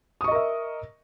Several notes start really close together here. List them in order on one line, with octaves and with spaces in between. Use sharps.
D#6 C#6 D#5 A#4 E5